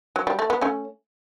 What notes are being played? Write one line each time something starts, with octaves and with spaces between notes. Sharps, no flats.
F#3
G3
A3
B3
A3 C#4